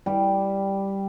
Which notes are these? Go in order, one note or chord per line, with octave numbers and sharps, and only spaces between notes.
G3 G4